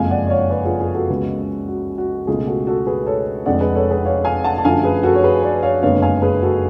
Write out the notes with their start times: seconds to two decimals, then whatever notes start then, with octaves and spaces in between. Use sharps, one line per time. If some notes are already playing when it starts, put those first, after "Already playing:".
Already playing: F#1 F2 F3 G#3 F5 G#5
0.10 D5 F#5
0.27 D5
0.30 C#5 F5
0.50 B4 D5
0.65 F4 G#4
0.80 F4 G#4
0.94 F#4 A4
1.09 C#2 C#3 G#3 B3
1.68 F#4
1.98 F#4
2.27 C#2 B2 A3 F4 G#4
2.47 F#4 A4
2.67 F#4 A4
2.87 G#4 B4
3.06 A4 C#5
3.46 F1 F2 D3 G#3 D5 F#5
3.61 G#4 B4
3.75 A4 C#5
3.90 G#4 B4
4.05 C#5 F5
4.25 F5 G#5
4.44 F#5 A5
4.58 A5
4.64 F#2 D3 F3 A3 F5 G#5
4.84 G#4 B4
5.03 F#4 A4
5.15 C#5
5.23 G#4 B4
5.43 B4 D5
5.63 C#5 F5
5.82 F#1 F2 D3 G#3 B3 C#5 F5
6.02 F5 G#5
6.22 G#4 B4
6.42 F#4 A4